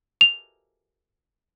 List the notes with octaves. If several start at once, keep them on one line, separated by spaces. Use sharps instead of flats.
F7